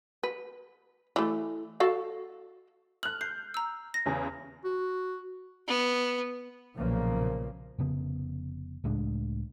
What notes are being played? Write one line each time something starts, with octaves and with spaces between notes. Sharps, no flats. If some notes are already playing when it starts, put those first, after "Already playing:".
B4
E3 A3
F#4 A4 F5
F6 F#6 F#7
G6 C7
A#5 E6
A#6
E2 C#3
F#4
B3
B1 A#2 C#3 F3 A#3
F1 C#3 B3
C#2 A2 G#3 D4